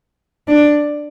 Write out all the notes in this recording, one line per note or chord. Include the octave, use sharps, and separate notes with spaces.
D4